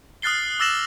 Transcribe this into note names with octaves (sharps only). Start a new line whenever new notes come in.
D#6 F6 F#6 A6 C7 G7
D6 E6 A6 A#6 E7 F#7